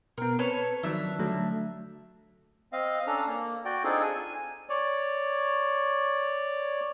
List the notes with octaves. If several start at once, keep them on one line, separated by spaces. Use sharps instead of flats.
B2 B3 A#4
C4 A4 B4 C#5
D#3 F3 F#3 D4 E5
D3 F#3 A3
C4 D#5 F5
C#4 D4 A4 A#5
A#3
F#4 D5 G5
C4 D4 D#4 F4 G#4 A4
G#5
C#5 D5